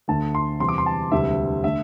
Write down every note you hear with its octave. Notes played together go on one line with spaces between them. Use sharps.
D2 D3 A3 A5
C6
E2 C3 E3 G3 C6
D6
C6
A5
E1 D2 C3 E3 G3 E5
D3 A3 E5